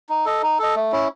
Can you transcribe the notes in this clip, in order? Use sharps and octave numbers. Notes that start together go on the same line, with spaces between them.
D#4
A4 D#5
D#4
A4 D#5
A3
C#4 E4